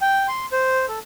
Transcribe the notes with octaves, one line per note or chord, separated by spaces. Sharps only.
G5
C6
C5
A4